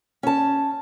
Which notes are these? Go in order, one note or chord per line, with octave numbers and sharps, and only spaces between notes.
C#4 A5